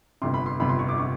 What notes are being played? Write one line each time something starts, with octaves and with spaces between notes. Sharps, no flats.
G1 F2 C3 C6
B5
C6
G1 F2 C3 B5
C6
C#6
D6
C3 C#6